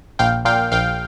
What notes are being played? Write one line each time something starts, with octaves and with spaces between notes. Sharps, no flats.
A#1 F5 G5
A#2 F5 G5
A#1 F5 G5